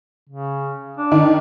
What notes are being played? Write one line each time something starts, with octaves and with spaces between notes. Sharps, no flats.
C#3
D4
D#3